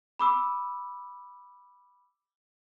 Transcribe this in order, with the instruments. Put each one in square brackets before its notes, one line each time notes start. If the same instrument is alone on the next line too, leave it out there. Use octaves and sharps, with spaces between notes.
[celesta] B5 D6 E6